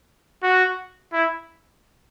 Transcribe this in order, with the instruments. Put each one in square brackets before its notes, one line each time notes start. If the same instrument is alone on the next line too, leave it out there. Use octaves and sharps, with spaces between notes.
[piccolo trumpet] F#4
E4